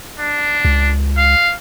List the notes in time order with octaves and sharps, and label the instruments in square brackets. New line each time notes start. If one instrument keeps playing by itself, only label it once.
[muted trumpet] D4
[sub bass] C#2
[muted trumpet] F5